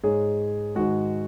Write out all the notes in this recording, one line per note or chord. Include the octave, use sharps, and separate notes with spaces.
G#2 G#3 G#4 C#5
G#2 D#3 G#3 F#4